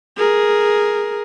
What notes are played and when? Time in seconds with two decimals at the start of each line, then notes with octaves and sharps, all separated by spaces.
0.17 G#4 A#4